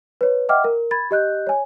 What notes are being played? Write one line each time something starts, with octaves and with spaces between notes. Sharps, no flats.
B4 C#5
D#5 E5 F#5 G5 D6 F6
A#4
B5 G#6 A6
G4 D#5 F#6 G6
C#5 G#5